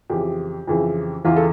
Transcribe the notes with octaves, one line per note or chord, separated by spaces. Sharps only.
F2 C#3 E3 G4
F2 C#3 E3
E2 C#3 E3 F4
A4